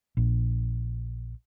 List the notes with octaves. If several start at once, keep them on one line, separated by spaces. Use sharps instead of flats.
A#1